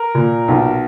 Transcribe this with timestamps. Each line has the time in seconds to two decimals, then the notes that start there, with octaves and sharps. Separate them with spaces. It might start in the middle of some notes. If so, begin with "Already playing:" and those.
Already playing: A#4
0.15 A#2
0.48 B1